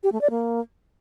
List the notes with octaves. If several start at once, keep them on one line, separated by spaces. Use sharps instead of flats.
G4
A3
D5
A#3